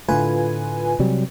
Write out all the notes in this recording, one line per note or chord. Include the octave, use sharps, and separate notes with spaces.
A2 D3 A3 F4 B4 G#5
C3 F#3 G3